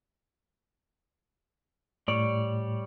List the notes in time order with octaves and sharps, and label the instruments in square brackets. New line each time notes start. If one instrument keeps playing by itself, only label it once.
[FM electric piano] A2 [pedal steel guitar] G3 C#5 D5